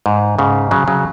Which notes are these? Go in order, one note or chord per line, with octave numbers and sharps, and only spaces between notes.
G#2
G#2 C#3
C#3 F#3
C#3 F#3